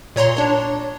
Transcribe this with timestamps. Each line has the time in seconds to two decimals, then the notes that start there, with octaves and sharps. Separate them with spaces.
0.16 A#2 C#5 A#5 C6
0.37 D4 C#5